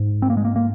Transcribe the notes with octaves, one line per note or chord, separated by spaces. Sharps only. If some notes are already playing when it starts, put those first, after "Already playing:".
Already playing: G#2
C4
A#3
G#3
A#3
A#3